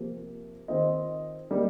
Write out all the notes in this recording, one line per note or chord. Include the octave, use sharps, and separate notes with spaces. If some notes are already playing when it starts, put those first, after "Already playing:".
Already playing: C3 F3 A#3 G4
D#3 C4 F4 D#5
G3 A#3 D#4 G4